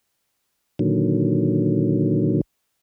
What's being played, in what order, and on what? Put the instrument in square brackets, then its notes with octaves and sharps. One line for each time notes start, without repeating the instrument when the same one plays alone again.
[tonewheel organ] A#2 D3 D#3 F#3